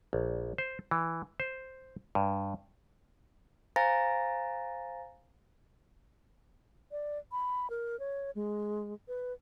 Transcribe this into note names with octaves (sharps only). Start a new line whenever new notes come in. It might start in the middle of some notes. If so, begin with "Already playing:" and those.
A#1
C5
E3
C5
G2
C5 F5 G#5 A#5 A6 A#6
D5
B5
A#4
C#5
G#3
B4